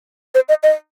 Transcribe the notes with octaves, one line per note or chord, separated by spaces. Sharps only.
C5
D#5
D#5